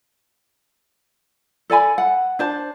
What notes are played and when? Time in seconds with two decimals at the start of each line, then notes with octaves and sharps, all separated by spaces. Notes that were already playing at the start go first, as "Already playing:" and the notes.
1.70 A4 D5 G#5 B5
1.98 F#5
2.39 D4 C5 A5